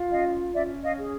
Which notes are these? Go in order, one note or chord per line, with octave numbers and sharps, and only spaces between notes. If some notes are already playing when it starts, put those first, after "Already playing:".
Already playing: F4
C#4 D#5 F5
C#4 D5 E5
D#5 F5
G#4